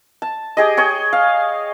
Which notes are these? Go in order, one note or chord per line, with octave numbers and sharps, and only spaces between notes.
A5
G4 G#4 D#5
G#4 C#5 G5
F5